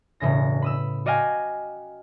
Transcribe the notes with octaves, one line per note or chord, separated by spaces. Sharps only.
E1 A2 C#3 A#6
B5 D#6 E6
F#4 D5 D#5 F5 G5 G#5